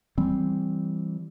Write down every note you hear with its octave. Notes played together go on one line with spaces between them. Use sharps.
E3 G3 C4